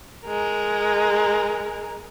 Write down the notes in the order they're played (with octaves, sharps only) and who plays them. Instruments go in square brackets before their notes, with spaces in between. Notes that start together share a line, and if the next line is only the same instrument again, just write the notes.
[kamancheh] G#3 A#4